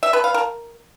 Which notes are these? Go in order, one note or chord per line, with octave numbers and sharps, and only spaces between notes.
E5
B4
F5
A#4